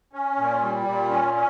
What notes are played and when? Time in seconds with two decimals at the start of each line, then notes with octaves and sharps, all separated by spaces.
0.13 C#4
0.38 A#2
0.62 G3
0.86 A#2
1.10 C#4
1.34 C#4